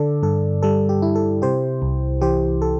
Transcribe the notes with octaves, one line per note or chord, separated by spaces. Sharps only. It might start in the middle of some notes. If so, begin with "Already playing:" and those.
Already playing: D3 A4 D5
G2 A4
G3 A4
G4
E4
A4
C3 G4 C5
C2
E3 G4 C5
A4